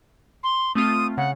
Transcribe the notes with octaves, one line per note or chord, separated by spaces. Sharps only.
C6
A3 C4 F4 D#6
C#3 F#5